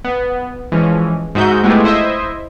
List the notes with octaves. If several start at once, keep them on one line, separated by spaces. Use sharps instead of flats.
B3
E3 F3 G#3 C#4
G#2 D#4 F#4 E5 G6
G#3 A3 B3 E4 F4 G4
E4 C5 D#5 E5